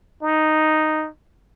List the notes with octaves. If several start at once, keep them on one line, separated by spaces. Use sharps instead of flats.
D#4